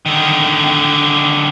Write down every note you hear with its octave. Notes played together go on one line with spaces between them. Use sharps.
D3 D#3